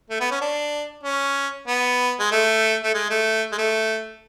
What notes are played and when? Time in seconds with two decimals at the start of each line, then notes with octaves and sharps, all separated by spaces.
0.10 A3
0.20 B3
0.31 C#4
0.41 D4
1.03 C#4
1.68 B3
2.19 G#3
2.31 A3
2.83 A3
2.94 G#3
3.10 A3
3.52 G#3
3.58 A3